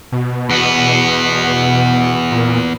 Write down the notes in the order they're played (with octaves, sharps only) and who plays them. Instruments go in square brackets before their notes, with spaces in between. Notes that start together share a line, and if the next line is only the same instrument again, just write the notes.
[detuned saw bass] B2
[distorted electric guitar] E2 B3
[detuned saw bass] A#2